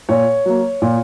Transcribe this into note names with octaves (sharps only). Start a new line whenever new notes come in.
A#2 C#5
F#3 A#3
A#2